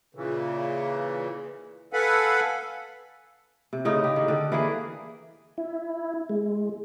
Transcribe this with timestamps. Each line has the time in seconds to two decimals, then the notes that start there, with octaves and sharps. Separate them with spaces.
0.15 A#2 C#3 E3
1.93 A4 B4 F5 F#5 G#5 B5
3.73 C3
3.85 A2 C#3 D#4
4.04 G4
4.16 D#3
4.28 D3 G4
4.52 E3 A#3 G#4
5.58 E4
6.29 G#3